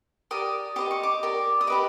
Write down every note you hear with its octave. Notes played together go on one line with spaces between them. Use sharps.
G4 A#4 D5 D#6
G4 C5 D#5 D6
C#6
D6
G4 A#4 D5
D#6
G4 B4 D#5 D6